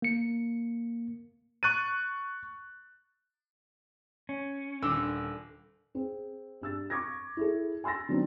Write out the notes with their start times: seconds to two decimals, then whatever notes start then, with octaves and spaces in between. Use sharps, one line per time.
0.02 A#3 C#7
1.63 C#6 F#6 A6 D#7
4.29 C#4
4.82 D#1 D3 E6
5.95 C4 G#4
6.62 G2 E6 A6
6.90 C#6 D6 G#6 A#6
7.37 E4 G#4 A4
7.84 G#5 C6 E6 A6 A#6
8.09 D3 F#3 B3 C4 D4 D#4